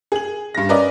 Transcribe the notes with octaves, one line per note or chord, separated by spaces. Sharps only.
G#4 F#7
G2 A#6
C#4 A#4 B4 D5 D#5